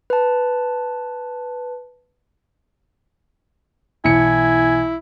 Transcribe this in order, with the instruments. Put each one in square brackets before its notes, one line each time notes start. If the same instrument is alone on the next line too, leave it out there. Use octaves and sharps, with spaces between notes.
[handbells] B4 A5
[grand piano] B1 E3 C#7 [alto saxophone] E4 [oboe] G#5